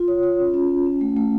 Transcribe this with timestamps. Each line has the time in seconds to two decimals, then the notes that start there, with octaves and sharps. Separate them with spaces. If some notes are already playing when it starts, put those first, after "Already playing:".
Already playing: F4
0.08 C#5
0.23 F4
0.39 C#4
0.54 C#4
0.70 C#4
0.86 C#4
1.01 A3
1.16 A3